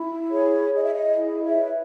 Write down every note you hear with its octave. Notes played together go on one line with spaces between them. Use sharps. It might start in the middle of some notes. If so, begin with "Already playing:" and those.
Already playing: E4
G#4 C#5
G#4 D#5
E5
D#5
E4
C#5 E5
B4